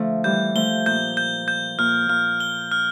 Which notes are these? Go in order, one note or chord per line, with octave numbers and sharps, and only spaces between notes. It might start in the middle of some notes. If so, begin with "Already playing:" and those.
Already playing: D3 F3 A3
E3 G3 G6
F3 A3 G7
A#2 G6
G6
G6
A#2 F6
A#2 F6
G7
F6